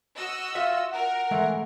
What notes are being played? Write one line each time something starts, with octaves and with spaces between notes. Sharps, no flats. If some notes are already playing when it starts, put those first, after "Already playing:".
F#4 D#5 E6
F4 E5
A#4 F#5
E3 G#3 A3